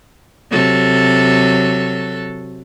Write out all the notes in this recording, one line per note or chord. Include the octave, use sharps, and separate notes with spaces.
C3 F#3 A4